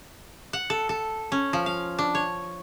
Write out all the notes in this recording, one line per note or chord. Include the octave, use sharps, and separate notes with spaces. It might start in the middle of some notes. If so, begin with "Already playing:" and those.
F#5
A4
A4
C#4
F3
F5
D4
C#5